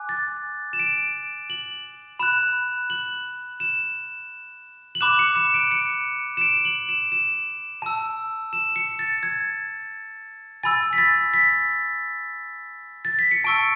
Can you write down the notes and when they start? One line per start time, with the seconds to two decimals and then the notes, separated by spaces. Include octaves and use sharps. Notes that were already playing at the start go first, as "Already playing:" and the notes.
Already playing: G#5 D6 F#6
0.09 A6
0.73 E7
0.79 D7
1.50 F#7
2.19 B5 F#6 E7
2.90 F#7
3.60 E7
4.95 F#7
5.01 B5 D6 F#6 E7
5.19 C#7
5.36 E7
5.54 D7
5.72 C#7
6.37 E7
6.41 D7
6.65 F#7
6.89 E7
7.12 E7
7.82 A5 E6
8.53 E7
8.76 C#7
8.99 A6
9.23 G#6
10.63 G#5 B5 E6 A6
10.93 B6
10.98 A6
11.34 B6
13.05 A6
13.19 B6
13.31 C#7
13.44 A5 C#6 E6 D7